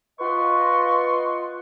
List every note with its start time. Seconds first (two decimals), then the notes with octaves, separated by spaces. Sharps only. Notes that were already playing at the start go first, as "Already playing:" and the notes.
0.20 F4 B4 D#5 F#5 C6 C#6